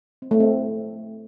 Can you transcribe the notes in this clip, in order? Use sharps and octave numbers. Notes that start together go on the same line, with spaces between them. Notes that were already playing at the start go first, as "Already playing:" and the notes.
C4
A3
C4